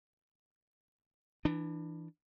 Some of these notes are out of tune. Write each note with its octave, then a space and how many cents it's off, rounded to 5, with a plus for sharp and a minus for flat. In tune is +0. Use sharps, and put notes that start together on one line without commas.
E3 +0 D4 +20